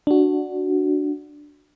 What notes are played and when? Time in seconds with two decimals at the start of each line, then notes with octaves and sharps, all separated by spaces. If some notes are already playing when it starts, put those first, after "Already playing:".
0.07 D4 F#4